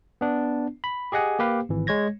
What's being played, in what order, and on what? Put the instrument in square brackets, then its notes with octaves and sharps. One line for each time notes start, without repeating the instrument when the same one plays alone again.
[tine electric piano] B3 D4
B5
G4 G#4 D#5 F#5 G#5
A#3 G4 B4 F5
G#1 E3
G#3 C#5 G#6 A#6